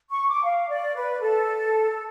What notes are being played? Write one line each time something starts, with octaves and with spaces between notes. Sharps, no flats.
C#6
D6
F5
D5
B4
A4